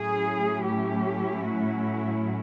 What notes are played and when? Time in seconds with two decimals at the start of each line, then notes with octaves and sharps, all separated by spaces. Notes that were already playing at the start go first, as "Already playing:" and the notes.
Already playing: A2 F#3 A3 C#4 E4 G#4
0.62 G4
1.45 F#4